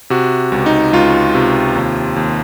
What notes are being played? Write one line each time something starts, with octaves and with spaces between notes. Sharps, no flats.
C3 F#4
C#2
D#4
C#2 F4
C3
D#2
D#2